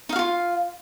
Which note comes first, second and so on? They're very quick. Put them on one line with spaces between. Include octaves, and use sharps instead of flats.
D#4 F5 F#4 F4